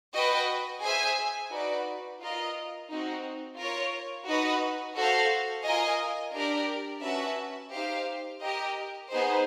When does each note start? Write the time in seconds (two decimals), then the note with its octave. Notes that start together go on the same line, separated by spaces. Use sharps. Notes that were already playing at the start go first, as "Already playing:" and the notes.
0.14 F#4 B4 D#5 G5
0.82 G#4 C5 E5 G#5
1.51 D#4 F#4 B4 D5
2.21 F4 A#4 D#5
2.90 C4 D#4 F#4
3.58 F4 A#4 C#5
4.28 D#4 F#4 B4
4.96 F#4 A4 C5 F5
5.65 F4 A#4 D#5 G#5
6.33 D4 G4 A#4 D5
7.02 C#4 F#4 B4 E5 A5
7.72 D#4 G4 C5 F5
8.40 G4 A#4 D#5 G5
9.10 B3 D#4 G#4 C5